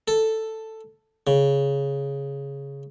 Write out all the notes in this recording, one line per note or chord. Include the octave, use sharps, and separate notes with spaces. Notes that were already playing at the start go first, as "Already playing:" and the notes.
A4
C#3